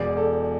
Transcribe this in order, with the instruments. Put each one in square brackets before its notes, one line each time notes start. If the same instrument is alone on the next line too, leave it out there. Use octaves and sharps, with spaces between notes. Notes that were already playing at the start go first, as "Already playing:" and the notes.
Already playing: [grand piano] E1 E2 B2 D5
A4